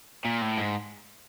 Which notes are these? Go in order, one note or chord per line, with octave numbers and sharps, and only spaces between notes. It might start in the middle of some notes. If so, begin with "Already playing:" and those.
A#2
A2
G#2